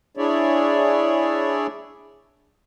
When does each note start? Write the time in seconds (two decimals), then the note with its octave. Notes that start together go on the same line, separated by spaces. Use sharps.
0.17 D4 E4 G#4 C#5 D5 E5